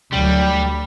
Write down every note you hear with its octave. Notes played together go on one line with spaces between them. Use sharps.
D2 F#3 G3